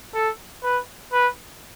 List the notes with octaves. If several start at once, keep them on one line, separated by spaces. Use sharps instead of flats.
A4
B4
B4